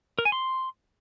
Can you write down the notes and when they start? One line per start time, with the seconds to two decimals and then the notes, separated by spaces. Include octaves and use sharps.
0.19 A#4
0.25 G#5
0.32 C6